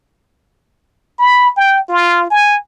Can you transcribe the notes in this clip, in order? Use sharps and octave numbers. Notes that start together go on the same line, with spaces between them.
B5
G5
F4
G#5